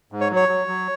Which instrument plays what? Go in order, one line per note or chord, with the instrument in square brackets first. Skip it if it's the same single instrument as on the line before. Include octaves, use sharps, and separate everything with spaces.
[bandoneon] G#2
C#5
F#3
C#5
F#3
F#3